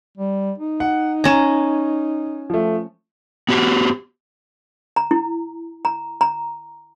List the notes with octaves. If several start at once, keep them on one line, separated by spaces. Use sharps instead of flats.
G3
D#4
F#5
C#4 A#5 G#6 E7
F3 A3
B3 F#4 G4
A#5
E4
A#5
A#5